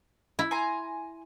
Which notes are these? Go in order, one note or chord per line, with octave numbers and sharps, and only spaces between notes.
E4
G#5 A#5 C6